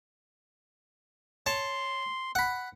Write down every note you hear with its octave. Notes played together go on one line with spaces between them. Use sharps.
C#5 A5 C6
F#5 B5